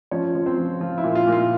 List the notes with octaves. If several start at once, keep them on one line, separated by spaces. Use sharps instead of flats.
F3 C#4 C#5
F3
C4 C5
F3
F3 F4
E4
A#2
F4
A#2
F4